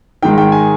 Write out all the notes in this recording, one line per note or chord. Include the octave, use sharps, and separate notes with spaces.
G#2 D#3 G#3 D#4 G5
G5
G#5